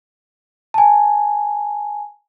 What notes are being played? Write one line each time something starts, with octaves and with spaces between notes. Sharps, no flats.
G#5 A5